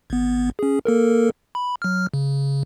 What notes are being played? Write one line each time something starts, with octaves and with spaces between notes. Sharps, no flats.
G#1 B3
C#4 G#4
A#3 A4 A#4
B5
F#3 F6
C#3